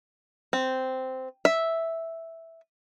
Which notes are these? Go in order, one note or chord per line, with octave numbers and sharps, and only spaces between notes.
C4
E5